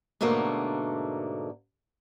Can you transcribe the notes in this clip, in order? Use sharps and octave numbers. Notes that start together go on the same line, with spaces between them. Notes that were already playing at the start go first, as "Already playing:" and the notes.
G#2 B2 D3 A3 A#3